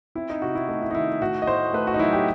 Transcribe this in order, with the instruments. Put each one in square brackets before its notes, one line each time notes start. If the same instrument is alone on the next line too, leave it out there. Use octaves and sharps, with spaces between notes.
[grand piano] C4 E4
D#4
C3 F#4
E4
A3 D#4
E4
D#4
D#3 E4
A2 F#4
D#5
A2 C5
A3 B4
F#4
D#4
F#3 E4
G4